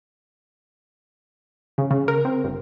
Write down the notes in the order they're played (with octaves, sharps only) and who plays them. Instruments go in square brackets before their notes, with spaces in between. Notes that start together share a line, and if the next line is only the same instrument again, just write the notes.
[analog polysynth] C#3
C#3
A#4
C4
G1